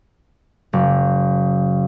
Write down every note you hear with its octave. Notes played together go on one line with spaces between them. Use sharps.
F#1